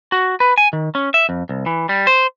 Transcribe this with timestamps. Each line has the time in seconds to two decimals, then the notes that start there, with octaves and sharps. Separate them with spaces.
0.12 F#4
0.40 B4
0.58 G#5
0.73 D#3
0.95 C#4
1.14 E5
1.29 F2
1.49 C2
1.66 E3
1.89 G3
2.07 C5